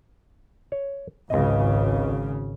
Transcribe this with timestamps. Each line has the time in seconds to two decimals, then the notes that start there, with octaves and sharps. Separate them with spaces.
0.72 C#5
1.30 G#1 C#2 C#3 D#5